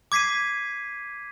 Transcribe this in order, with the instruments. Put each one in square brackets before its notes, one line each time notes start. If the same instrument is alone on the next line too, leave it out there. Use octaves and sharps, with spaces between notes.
[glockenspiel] D6 G#6 B6 C7 D#7